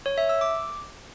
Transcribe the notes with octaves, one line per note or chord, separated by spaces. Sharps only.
C#5
E5
E6
D6